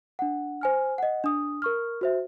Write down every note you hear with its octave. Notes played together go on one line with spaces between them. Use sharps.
D4 F#5
C5 G#5 F6
D#5 F#5
D4 D#6
A#4 C#6 F6
F#4 C5 E5